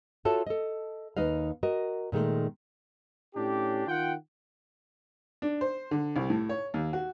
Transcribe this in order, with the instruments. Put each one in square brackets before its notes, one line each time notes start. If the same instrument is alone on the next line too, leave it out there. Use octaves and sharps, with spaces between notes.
[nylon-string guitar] F4 F#4 A4 C#5 E5
A4 D#5
D#2 D#4 B4 D#5 F5
F#4 A#4 D#5
A#2 D#3 G#3 A3
[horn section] A2 C#4 D4 G4
D#3 F4 F#5 G5
[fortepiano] D4
C5
D3
C2
A2
C#5
D#2
F#4